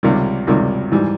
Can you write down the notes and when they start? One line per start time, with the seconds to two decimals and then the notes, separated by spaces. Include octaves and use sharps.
0.03 C#2 C3 D#3 G3
0.47 C#2 C3 D#3 G3
0.91 G#2 E3 G3